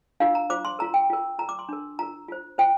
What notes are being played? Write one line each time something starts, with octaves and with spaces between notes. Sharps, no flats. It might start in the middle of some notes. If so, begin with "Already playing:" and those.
D4 F4 A#4 F5
A#5
F4 C5 D6
C6
F4 A#4 A#5
G5
F4 A#4
F4 A#4 A#5
D6
C6
D4 A#4
F4 A#4 A#5
F4 C5
F4 C5 G5